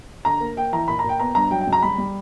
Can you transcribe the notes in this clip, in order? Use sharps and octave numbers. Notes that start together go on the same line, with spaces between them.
D3 A#5
A#3
A#3 G5
E3 A#5
A#2 B5
A#5
A#2
G5
B3 A#5
G2 A#5
F#3 G5
G5
C#2
A#5
G3 B5
G3